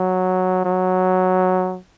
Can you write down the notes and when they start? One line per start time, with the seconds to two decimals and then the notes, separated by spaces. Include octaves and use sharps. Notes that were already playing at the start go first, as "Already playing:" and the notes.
Already playing: F#3
0.65 F#3